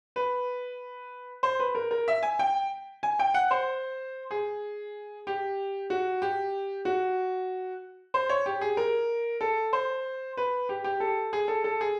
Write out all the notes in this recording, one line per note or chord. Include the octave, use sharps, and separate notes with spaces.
B4
C5
B4
A#4
A#4
E5
G#5
G5
G#5
G5
F#5
C5
G#4
G4
F#4
G4
F#4
C5
C#5
G4
G#4
A#4
A4
C5
B4
G4
G4
A4
G#4
A4
A4
G#4